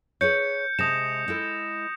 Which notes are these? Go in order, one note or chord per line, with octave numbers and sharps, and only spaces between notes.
G#4 B4 C#5 G6 C#7
C3 G#3 A5 D#6 A#6 E7
G#3 E4 A4